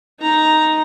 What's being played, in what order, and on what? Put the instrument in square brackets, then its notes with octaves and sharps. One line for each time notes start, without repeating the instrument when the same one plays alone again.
[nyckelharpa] D#4 A#5